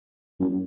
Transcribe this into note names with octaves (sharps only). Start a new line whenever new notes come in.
F#2